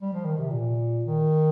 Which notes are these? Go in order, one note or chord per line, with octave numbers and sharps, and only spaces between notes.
G3
F3
D#3
C3
A#2
D#3